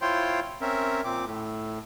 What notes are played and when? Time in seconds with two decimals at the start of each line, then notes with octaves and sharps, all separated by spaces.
0.02 E4 F4 C5 C#5 G5 C6
0.61 C4 C#4 A#4 E5
1.04 A#2 C4 D6
1.25 A2